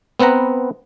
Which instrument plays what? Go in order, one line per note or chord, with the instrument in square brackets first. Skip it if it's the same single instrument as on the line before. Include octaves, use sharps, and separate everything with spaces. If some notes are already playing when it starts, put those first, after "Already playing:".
[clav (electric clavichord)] B3 C4 B4 F#5 A#5